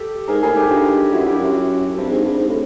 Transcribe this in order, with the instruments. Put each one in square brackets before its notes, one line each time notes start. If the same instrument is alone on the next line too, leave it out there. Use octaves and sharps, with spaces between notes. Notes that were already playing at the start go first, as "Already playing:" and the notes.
Already playing: [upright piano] G4 A4
[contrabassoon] G#2 [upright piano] G#4 A#4
[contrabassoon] A2 [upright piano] G#4 A#4
[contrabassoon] G#2
[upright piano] G4 A4
[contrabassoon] G2 [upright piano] D#4 F4
[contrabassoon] F#2 [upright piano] E4 F#4
[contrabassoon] G2 [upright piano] F4 G4
[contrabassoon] F#2 [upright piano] E4 F#4
[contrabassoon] G2 [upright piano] C4 D4
[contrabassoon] G#2
G2
G#2
A2